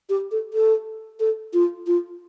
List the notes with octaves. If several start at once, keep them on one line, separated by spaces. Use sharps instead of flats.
G4
A4
A4
A4
F4
F4